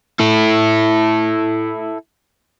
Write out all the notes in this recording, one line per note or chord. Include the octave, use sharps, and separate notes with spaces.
E4 A4